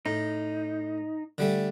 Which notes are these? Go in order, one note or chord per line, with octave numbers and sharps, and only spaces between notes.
A2 D#4
D3 G3 A3